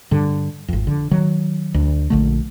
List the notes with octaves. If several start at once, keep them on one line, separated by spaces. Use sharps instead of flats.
G2 D3
G#1 F2
D3
D#3 F#3
D2
A#1 D3 A3